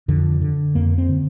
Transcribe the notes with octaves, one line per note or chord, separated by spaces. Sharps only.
F2 D3
D3
F2 A#3
C4
D3